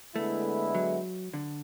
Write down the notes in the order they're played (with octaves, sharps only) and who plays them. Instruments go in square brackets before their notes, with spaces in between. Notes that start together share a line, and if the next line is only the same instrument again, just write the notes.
[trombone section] D3 G#3 B3 E4 [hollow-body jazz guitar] A3
[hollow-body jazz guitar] F#3
D3